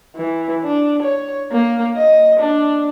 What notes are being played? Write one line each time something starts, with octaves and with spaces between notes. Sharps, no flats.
E3
D4
C#5
A#3
D#5
D4